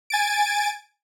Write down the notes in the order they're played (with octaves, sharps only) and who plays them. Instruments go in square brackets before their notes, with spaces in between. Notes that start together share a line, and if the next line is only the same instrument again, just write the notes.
[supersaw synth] G#5 A6 D7